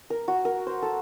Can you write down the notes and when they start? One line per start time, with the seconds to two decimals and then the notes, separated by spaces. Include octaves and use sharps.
0.10 A#4
0.28 F#4
0.45 A#4
0.67 C5
0.82 A4